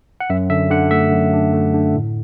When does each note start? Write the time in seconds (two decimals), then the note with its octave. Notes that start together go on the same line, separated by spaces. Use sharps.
0.20 F#5
0.30 F#2 E5
0.50 D3 E5
0.70 D3 F#5
0.91 A3 E5
1.12 F#2
1.33 D4
1.53 A3
1.74 D3
1.95 A2